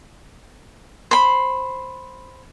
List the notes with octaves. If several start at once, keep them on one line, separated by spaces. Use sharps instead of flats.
C5 B5